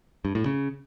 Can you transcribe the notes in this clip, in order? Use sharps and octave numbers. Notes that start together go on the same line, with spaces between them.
G2
A2
C#3